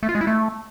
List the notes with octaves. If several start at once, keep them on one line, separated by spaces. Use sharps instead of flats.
A3
F4
G#3
E4
A3